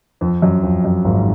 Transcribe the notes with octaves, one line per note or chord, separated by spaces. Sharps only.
F2
F#2
F2
F#2
G#1 G#2